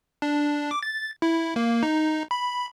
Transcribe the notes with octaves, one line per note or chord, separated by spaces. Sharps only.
D4
D6
A6
E4
A#3
D#4
B5